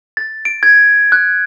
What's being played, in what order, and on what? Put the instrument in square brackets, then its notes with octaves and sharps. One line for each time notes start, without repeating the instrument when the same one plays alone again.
[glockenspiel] A6
D7
G#6
F#6